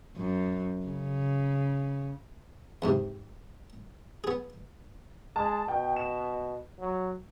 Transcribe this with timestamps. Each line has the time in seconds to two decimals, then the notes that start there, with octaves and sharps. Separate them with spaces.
0.16 F#2
0.87 C#3
2.82 E2 G#2 C3
4.24 B3 G#4
5.36 G#3 A5
5.68 B2 G5
5.96 E7
6.79 F#3